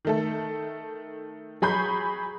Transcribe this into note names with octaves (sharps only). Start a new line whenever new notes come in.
D#3 A3 A4
F#3 G#4 B5 C#6 G6